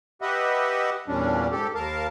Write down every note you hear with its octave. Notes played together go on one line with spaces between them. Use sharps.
G4 B4 D#5 E5 F#5
E2 A#2 G3 C#4 D4
G#2 G4 A4
D#2 A#4 F5 A5